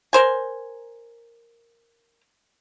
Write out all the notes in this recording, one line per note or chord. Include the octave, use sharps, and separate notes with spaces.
A#4 C5 G#5